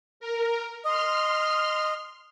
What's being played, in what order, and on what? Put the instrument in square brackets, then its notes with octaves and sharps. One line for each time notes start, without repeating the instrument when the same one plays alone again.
[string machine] A#4
[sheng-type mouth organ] D#5 [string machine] C6 F6